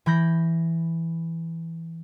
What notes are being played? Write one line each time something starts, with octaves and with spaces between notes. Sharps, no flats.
E3 B5 G6 A#6